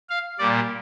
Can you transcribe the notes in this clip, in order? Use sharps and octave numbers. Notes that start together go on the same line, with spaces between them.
F5
A#2 G3 D5